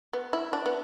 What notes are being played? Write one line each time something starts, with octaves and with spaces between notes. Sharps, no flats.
B3
E4
D4
B3